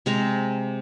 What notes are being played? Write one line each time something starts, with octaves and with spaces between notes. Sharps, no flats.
C3 G#3 A#5